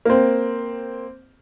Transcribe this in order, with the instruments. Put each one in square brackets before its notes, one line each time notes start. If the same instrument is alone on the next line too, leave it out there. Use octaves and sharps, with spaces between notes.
[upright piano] A#3 C4